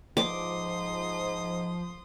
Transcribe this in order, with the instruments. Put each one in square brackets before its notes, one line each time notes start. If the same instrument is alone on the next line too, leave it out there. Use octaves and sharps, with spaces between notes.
[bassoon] G#2 [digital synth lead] F3 [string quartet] C6 D#6 [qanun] D6